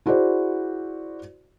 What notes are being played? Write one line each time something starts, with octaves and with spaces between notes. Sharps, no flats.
E4 F#4 G#4 C5 D5